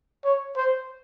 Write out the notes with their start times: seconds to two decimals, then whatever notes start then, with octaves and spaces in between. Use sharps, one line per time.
0.25 C#5
0.56 C5